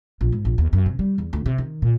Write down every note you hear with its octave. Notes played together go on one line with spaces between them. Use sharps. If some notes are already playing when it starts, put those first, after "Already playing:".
A#1
G#2
A#1
D#2
F#2
C3
G3
E2
D2
C3
D#3
A#2